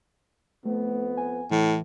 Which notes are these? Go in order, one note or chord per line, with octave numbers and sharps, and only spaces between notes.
F2 A3 B3
G#5
A2 E3